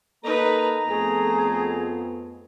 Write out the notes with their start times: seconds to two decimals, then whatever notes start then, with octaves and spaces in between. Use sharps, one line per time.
0.24 A#3 D#4 A4 B4 A#5
0.88 F2 A3 B3 G#4 A4